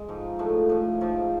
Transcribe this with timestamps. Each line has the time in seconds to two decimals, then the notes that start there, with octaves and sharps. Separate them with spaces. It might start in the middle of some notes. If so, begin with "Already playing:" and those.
Already playing: G#3
0.08 G#2 F3
0.39 A2 F3 A3
0.69 A2 F3
1.01 G#2 F3